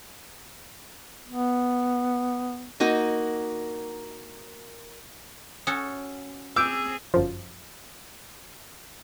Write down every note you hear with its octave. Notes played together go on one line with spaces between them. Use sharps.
B3
A#3 D#4 F#4 A#4
C#4 F#4 A4 D#6
C4 G#4 D6 E6 G6 D7
G1 F#2 F3